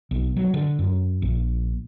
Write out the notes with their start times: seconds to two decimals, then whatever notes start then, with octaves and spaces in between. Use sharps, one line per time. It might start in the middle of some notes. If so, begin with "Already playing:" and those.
0.11 B1
0.36 F#3
0.54 D3
0.79 F#2
1.22 A#1